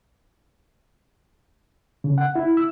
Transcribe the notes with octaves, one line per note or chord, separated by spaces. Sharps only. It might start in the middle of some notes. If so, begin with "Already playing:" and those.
C#3
F#5
E4
E6